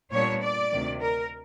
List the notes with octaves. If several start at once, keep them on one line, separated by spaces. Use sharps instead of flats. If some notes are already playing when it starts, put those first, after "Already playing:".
A#2 G3 B3 D4 C#5
D5
D2 C3 D#3
A#4